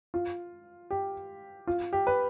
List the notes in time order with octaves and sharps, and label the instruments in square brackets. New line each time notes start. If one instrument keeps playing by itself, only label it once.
[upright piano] F4
G4
F4
G4
B4